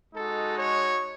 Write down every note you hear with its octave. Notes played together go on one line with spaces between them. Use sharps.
G#3 D#4 F#4 A4
C#5